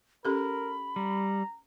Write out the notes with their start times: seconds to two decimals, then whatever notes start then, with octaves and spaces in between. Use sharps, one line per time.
0.25 C#4 G4 A4 A#4 B5
0.96 G3 A#5